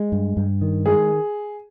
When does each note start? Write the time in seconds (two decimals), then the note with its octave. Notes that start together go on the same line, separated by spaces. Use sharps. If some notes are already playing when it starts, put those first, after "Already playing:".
Already playing: G#3
0.12 G2
0.37 G2
0.62 D#3
0.86 G#3 G#4